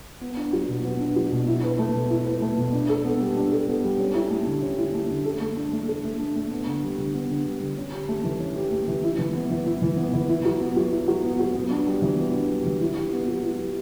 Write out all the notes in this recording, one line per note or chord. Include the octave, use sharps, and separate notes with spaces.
B3
D4
F#3
B2
B3
D4
F#3
B2
E4
B4
A3
B2
E4
B4
A3
B2
D4
A4
B3
G3
D4
A4
B3
G3
C#4
E4
A3
D3
C#4
E4
A3
D3
A4
A3
D4
A3
A4
A3
D4
A3
B3
D3
G3
D3
B3
D3
G3
D3
C#4
G4
A3
E3
C#4
G4
A3
E3
E4
E3
B3
E3
E4
E3
B3
E3
E4
F#3
B3
F#3
E4
F#3
B3
F#3
B3
D4
G3
E3
B3
D4
G3
E3
E4
G4
B3
F#3
E4
G4